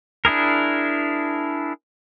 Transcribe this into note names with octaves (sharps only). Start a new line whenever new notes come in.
D4 E4 G#4 A#4